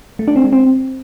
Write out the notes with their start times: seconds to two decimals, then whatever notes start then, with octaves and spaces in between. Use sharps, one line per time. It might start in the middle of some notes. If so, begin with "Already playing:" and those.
0.19 A3
0.28 D4
0.36 C4
0.44 G#3
0.53 C4